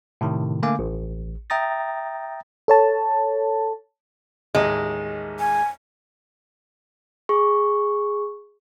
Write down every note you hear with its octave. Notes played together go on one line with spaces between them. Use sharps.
A2 C3 D#3
D3 A3 A#3 F5 G#5 D6
A1
E5 G5 A#5 D#6 A6 A#6
A4 C#5 A5
A1 D#2 G#3 D#5
G#5
G#4 C#6